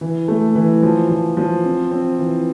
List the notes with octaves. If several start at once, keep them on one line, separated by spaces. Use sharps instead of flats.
E3
A3
E3
F3
F3
F3
C4
C4
E3